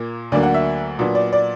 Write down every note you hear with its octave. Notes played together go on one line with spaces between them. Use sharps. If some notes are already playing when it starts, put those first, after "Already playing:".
Already playing: A#2 A#3
D2 D3 F#3 A#3 D4 D5
F#5
E5
A#2 F#3 B3 D4
D5
D5